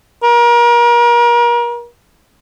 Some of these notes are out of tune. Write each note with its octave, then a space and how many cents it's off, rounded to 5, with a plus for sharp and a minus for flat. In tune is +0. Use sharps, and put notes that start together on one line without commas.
A#4 +35